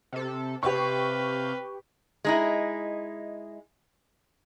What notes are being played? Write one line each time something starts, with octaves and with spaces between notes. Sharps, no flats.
C3 A4
C3 G4 B4 F5 C#6 G6
G#3 D#4 E4